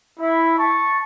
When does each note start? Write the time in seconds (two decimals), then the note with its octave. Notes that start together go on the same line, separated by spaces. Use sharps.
0.18 E4
0.58 A5 C#6